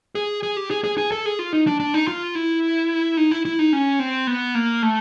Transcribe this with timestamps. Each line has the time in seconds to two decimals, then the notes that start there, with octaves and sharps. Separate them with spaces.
0.15 G#4
0.43 G#4
0.57 G4
0.71 G#4
0.84 G#4
0.98 G#4
1.12 A4
1.26 G#4
1.39 F4
1.53 D#4
1.67 D4
1.80 D4
1.94 D#4
2.08 F4
2.35 E4
3.17 D#4
3.31 E4
3.45 E4
3.59 D#4
3.73 C#4
4.00 C4
4.27 B3
4.55 A#3
4.82 A3